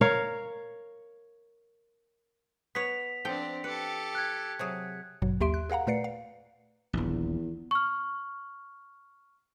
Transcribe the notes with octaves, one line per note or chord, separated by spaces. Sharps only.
A#4 C#5 F5
B3 C#5 B6 F7
F3 C4 D4 A4 G5
G4 A4 B4 C#7
F#6 G#6
C3 F#3 G#4
A1 G2 B2 F#3
D#2 A#3 G4 E5 C6 D7
F#6
G#4 A#4 F5 F#5 A#5
A#2 A3 B4 D5 C7 C#7
F5
D#1 A#1 E2
C#6 F6